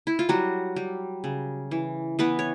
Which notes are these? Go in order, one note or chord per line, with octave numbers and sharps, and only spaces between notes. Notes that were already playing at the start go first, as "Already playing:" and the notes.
E4
F4
F#3 G3 F#4
G3
C#3
E3
E3 B3 B4
C#5